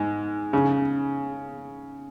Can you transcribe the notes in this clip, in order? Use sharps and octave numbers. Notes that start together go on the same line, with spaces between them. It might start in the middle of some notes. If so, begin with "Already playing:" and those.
Already playing: G#2
C#3